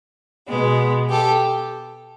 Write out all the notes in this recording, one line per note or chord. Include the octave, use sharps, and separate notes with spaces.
B2 G#3 B3
G4 A4